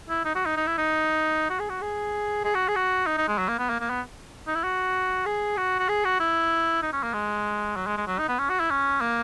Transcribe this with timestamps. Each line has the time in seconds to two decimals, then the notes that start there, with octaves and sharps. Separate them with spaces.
0.10 E4
0.25 D#4
0.35 F#4
0.46 D#4
0.57 D#4
0.67 E4
0.78 D#4
1.50 F#4
1.60 G#4
1.69 F#4
1.81 G#4
2.44 G#4
2.55 F#4
2.68 G#4
2.75 F#4
3.06 D#4
3.17 D#4
3.28 G#3
3.38 F#3
3.48 A#3
3.59 B3
3.70 A#3
3.80 A#3
3.90 B3
4.47 D#4
4.55 E4
4.64 F#4
5.26 G#4
5.57 F#4
5.79 F#4
5.89 G#4
6.04 F#4
6.20 E4
6.82 D#4
6.93 C#4
7.03 A#3
7.14 G#3
7.76 F#3
7.87 G#3
7.97 G#3
8.07 F#3
8.18 D#4
8.29 B3
8.39 C#4
8.49 F#4
8.60 E4
8.70 C#4
9.01 A#3